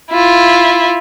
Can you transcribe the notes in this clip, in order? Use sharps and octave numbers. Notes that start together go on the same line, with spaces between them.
E4 F4